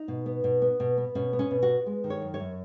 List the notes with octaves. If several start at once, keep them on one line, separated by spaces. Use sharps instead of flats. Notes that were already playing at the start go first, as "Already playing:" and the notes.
Already playing: D#4
B2
B3
B2
B3
B2
B3
B2 C#4
B3
C#4
B2
F#4
B3
G#3
D#3
C#5
F#2
C#5
F#2